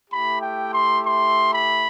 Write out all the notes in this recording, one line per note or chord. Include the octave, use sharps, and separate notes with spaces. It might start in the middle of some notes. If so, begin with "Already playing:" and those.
A3 E4 G4 B5
G5
C6
C6
B5